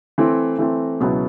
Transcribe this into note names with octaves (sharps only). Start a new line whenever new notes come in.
E3 A3 C4
E3 A3 C4
C#2 B2 F#3 B3 E4